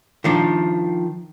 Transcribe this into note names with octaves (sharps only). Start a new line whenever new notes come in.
D#3 F3 D4